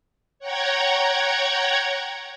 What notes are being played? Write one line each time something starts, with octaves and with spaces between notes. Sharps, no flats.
C#5 F#5 G5 A#5 G#6